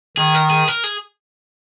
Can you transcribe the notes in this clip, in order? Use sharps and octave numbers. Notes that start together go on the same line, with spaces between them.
D#3 G#4
A#4
G#4
A#4
G#4